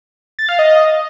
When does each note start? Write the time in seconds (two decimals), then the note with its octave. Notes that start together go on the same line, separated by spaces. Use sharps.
0.39 A6
0.49 F5
0.59 D#5